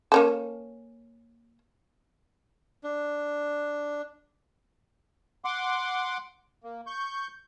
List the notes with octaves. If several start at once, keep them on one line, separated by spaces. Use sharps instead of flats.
A#3 C#4 A4
D4
F#5 C6 D6
A#3
C#6 G6